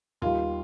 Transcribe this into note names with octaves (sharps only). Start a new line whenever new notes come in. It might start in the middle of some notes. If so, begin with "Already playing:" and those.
D#2 D#3 G3 F4